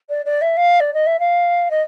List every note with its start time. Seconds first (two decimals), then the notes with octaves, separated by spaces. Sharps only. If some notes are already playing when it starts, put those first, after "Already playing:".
0.09 D5
0.25 D5
0.41 E5
0.56 F5
0.80 D5
0.93 D#5
1.06 E5
1.19 F5
1.70 D#5